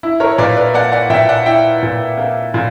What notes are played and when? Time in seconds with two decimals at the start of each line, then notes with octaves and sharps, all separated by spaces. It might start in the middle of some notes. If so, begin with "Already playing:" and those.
0.03 E4
0.20 A#4 C#5
0.31 C#5
0.38 A#2 B4 D5
0.57 B4 D5
0.74 A#3 D5 F#5
0.92 D5 F#5
1.10 A#2 E5 G5
1.29 D5 F#5
1.46 E4 E5 G5
1.83 A#2
2.18 A#3
2.54 A#2